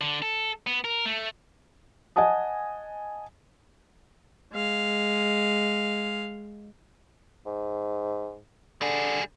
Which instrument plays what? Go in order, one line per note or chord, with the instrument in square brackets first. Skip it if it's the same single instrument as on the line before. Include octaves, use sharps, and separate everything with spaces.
[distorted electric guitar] D3
A4
B3
A#4
A3
[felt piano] D#5 F#5 G#5 A5 D#6
[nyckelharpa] G#3 F5
[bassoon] G#2
[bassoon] D3 [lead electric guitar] G3 G#4